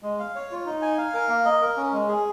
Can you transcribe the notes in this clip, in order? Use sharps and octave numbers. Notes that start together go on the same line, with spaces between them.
G#3
F5
C#5
F4
D#4
G#5
F5
A#4
A#3
D#5
A#4
C#4
G#3
G#4